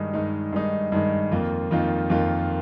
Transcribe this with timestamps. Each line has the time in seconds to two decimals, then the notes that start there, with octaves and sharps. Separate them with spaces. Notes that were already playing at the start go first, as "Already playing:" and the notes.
Already playing: G2 D#3 G#3 D#4
0.13 G2 D#3 G#3 D#4
0.53 G2 D#3 G#3 D#4
0.92 G2 D#3 G#3 D#4
1.31 F2 D#3 A#3 F4
1.71 F2 D#3 A#3 F4
2.10 F2 D#3 A#3 F4